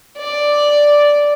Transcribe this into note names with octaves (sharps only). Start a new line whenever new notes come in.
D5